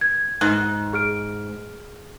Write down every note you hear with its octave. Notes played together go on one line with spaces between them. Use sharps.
G#6
G#2 F#6
G#4 F6 D7